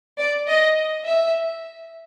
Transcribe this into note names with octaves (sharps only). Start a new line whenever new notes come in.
D5
D#5
E5